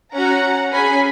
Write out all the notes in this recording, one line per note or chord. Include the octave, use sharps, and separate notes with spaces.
C#4 F#4 F#5 A#5
C#4 G#4 G#5 B5